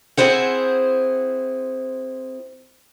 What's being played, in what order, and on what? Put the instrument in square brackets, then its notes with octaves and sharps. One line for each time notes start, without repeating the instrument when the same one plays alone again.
[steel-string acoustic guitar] C4 E4 G#4 C5 F#5